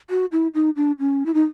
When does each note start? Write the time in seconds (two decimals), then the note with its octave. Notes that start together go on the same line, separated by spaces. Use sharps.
0.10 F#4
0.32 E4
0.54 D#4
0.76 D4
0.99 C#4
1.26 E4
1.34 D#4